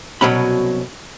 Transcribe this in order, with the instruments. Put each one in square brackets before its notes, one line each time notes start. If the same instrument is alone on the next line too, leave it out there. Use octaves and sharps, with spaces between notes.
[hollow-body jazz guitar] C2 B2 D#3 F#3 C#4 B5